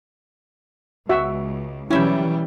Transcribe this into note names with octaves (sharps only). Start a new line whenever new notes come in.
C#2 F#4 E5
B2 E3 F#3 G3 C#4 E4 E5 G5